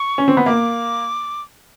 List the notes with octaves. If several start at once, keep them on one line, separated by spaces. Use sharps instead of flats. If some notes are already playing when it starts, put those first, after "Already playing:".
Already playing: C#6
C#4
C4
B3
A#3 D6